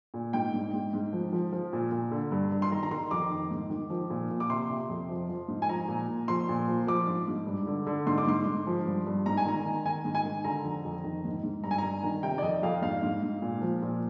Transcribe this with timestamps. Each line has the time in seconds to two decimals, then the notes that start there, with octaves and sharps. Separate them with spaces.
0.14 A#2
0.33 G#2 G5
0.54 G#2
0.73 G#2
0.93 G#2
1.13 F3
1.33 F3
1.52 F3
1.73 A#2
1.92 A#2
2.11 D3
2.32 G2
2.52 G2
2.62 C6
2.71 D#3 A#5
2.83 A#5
2.91 D#3 C6
3.11 F2 D6
3.31 D#3
3.51 G#2
3.70 D#3
3.90 F3
4.10 A#2
4.30 A#2
4.40 D6
4.50 C3 C6
4.70 C3
4.89 F2
5.09 F3
5.29 F3
5.48 G#2
5.62 G#5
5.69 F3 A#5
5.88 A#2
6.08 A#2
6.28 F3 C6
6.49 A#2
6.68 F3
6.87 F3 D6
7.07 G#2
7.28 G#2
7.47 G2
7.67 D3
7.87 D3
8.07 G#2 C6
8.18 D6
8.27 G#2 C6
8.46 G#2
8.67 F3
8.86 G2
9.06 G2
9.26 G#2 A#5
9.37 G#5
9.46 D#3 A#5
9.65 D#3
9.85 D#3 G#5
10.05 G#2
10.15 G#5
10.25 D#3
10.44 D3 A#5
10.64 F2
10.85 F2
11.04 D#3
11.25 G#2
11.43 G#2
11.64 G2 A#5
11.71 G#5
11.78 G2 A#5
12.03 D#3
12.23 C3 G5
12.38 D5
12.42 F2 D#5
12.63 F2 F5
12.82 G#2 F5
13.02 G#2
13.22 G#2
13.42 A#2
13.62 F3
13.82 A#2